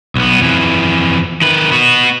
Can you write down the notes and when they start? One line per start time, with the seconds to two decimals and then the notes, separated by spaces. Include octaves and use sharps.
0.16 B1 B3
0.41 F2 E3
1.42 D#3 B4
1.71 B3 F#4